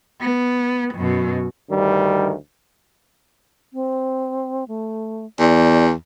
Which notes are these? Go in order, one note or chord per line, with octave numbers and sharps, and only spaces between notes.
B3
F#2 B2
D2 G2 D#3 G3
C4
A3
E2 D5